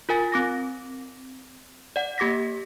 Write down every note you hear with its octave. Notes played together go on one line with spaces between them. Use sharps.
F4 A#4 G#5 A6
C4 D6 A#6
D5 F#5
A#3 G4 D6 A#6 B6